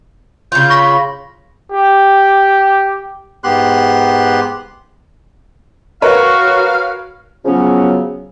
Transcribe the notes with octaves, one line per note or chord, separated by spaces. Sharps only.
C#3 F4 G6
B5 C#6 A#6
G4
G#2 B3 G4 C6 F#6
F#4 A#4 B4 C#5 F5
C#3 F3 F#3 B3 C#4 F#4